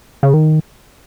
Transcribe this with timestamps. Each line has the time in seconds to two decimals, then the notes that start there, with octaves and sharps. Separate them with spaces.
0.23 C#3
0.34 D#3